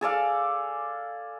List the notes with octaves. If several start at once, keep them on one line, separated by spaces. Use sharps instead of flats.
G#4 A4 D5 F5